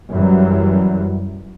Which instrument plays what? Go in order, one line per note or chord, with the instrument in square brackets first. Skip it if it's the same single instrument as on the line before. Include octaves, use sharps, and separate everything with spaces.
[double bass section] F#2 E3 F#3 G3